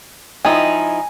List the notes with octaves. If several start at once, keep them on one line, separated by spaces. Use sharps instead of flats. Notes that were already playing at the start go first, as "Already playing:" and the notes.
F3 D#4 E4 G#5